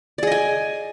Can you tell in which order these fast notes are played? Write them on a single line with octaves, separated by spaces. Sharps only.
D5 G#4 D#5 G#5